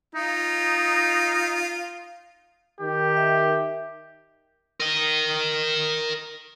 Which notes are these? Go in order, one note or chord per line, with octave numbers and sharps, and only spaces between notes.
D#4 F4
D#3 G4
E5
A#4 D#5